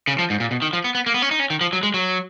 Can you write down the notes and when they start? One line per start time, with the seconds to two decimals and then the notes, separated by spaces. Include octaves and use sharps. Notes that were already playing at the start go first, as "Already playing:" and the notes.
0.07 C#3
0.19 F3
0.30 G#2
0.40 A#2
0.51 B2
0.62 D#3
0.73 F3
0.84 B3
0.95 B3
1.06 A#3
1.14 B3
1.22 C#4
1.31 D#4
1.39 C#4
1.50 D#3
1.61 F3
1.73 F#3
1.83 G#3
1.94 F#3